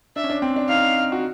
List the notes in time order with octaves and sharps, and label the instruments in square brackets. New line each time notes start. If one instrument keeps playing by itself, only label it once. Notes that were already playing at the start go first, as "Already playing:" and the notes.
[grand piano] D4 [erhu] E5
[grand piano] C#4
D4
C4
D4
[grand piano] D#4 [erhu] F5
[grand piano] F#4